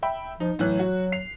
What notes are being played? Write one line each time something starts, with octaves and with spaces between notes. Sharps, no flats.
E5 G5 B5
F3 D#4
A2 E3 F#3 F#6
F#4
C7 F7